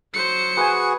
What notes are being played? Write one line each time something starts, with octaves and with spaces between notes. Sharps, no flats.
F#3 C5 C#7
F#4 G#4 B4 G#5